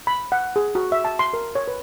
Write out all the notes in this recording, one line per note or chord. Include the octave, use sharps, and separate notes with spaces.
B5
F#5
G#4
F#4
E5
A5
C6
A#4
C#5
B4